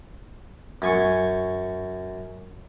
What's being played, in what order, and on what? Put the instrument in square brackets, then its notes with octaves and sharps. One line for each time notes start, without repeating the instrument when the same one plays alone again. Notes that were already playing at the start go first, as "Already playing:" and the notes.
[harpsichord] F#2 G#5 C#6